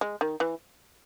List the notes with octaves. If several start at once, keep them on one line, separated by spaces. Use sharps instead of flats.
G#3
D#3
E3